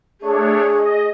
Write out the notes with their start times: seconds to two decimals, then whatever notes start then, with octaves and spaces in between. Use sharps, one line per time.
0.21 A3 D4 G#4 C#5
0.77 D#5